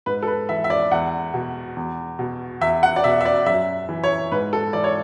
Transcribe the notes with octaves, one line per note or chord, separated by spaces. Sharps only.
G#2 B4
A4
B4
E3 E5
E5
D5
E2 F#5
B2
E2
B2
E2 E5
F#5
D5
B2 E5
E5
D5
F#2 E5
E3
C#5
G#2 B4
A4
E3 D5
C#5